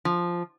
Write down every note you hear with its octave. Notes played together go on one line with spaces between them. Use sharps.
F3